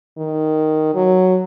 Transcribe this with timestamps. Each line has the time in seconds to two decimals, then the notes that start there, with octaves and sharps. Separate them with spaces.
0.18 D#3
0.95 F#3